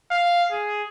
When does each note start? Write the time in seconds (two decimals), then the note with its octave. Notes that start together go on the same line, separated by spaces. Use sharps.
0.11 F5
0.52 G#4